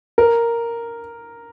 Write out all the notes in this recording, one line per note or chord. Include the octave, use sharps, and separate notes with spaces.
A#4